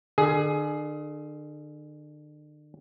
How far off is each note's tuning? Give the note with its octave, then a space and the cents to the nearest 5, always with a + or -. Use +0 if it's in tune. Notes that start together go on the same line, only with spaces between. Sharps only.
D3 +40 G#4 +15